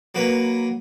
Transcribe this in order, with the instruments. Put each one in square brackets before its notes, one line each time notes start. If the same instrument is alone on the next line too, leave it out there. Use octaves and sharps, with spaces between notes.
[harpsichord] F#3 A#3 B4